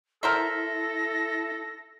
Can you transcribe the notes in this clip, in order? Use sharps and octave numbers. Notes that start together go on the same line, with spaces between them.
E4 A4 A#4 C5 E5 A#6